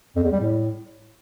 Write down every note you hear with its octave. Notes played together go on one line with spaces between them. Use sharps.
F2
E2
G3
A2